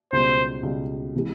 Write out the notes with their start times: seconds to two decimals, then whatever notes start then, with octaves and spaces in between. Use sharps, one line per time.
0.13 C#2 B2 G3 C5
0.63 C#2 B2 G3
1.16 C3 E3 G#3